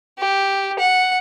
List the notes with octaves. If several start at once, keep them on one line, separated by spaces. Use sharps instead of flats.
G4
F#5